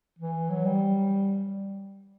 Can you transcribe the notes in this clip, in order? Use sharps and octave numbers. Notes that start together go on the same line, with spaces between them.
E3
F#3
G3